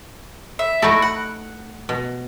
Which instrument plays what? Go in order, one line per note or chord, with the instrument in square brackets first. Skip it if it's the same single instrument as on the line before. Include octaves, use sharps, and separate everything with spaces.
[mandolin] E5
[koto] A3 D#4 A4 [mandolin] E4 F#4
[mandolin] F#5
[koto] B2